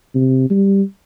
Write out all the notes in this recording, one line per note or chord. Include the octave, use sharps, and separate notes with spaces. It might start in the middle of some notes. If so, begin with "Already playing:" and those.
C3
G3